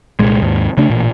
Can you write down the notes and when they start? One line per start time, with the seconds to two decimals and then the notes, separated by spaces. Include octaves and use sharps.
0.19 C2 A#2 G#3
0.42 D#2 G#2
0.77 C#3 A3 D4
0.90 A1 A#2